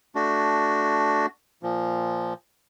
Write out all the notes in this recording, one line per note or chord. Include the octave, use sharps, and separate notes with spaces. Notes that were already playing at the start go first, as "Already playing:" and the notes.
A3 D4 F#4
A#2 F3